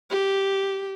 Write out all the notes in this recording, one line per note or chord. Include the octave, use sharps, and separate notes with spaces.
G4